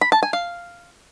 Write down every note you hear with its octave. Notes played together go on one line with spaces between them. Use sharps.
B5
A5
G#5
F5